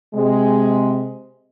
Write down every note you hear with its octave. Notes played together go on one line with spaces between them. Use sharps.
C3 G#3